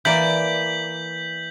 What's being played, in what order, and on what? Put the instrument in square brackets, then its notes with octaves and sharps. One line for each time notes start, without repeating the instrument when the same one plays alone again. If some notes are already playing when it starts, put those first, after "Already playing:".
[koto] E3 A#3 D5 [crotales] G6 B6 F#7